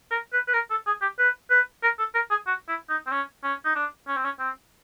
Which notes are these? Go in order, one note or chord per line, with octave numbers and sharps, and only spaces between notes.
A#4
B4
B4
A#4
A4
G#4
G4
B4
B4
A#4
A4
A#4
G#4
F#4
E4
D#4
C4
C#4
C#4
D#4
D4
C#4
C4
C#4
C4